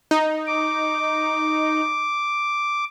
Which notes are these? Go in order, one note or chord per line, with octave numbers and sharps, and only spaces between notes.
D#4
D6